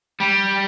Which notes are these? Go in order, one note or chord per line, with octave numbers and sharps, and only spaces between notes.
G3